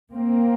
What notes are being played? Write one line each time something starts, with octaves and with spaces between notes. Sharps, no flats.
A#3 C4